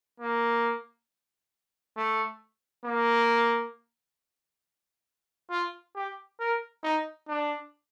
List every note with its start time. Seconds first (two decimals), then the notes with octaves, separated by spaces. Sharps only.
0.20 A#3
1.97 A3
2.85 A#3
5.50 F4
5.95 G4
6.40 A#4
6.83 D#4
7.28 D4